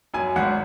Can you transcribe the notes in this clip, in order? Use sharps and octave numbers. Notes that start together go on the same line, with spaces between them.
F#2 G#5
G#1 F#5